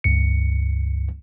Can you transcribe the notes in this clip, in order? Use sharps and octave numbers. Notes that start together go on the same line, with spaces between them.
C#2 G2 C#7